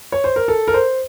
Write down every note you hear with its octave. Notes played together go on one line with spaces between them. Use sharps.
C#5
C5
A#4
A4
A#4
C5